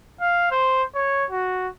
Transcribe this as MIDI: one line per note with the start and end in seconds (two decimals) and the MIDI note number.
0.20 0.49 77
0.51 0.83 72
0.95 1.25 73
1.31 1.68 66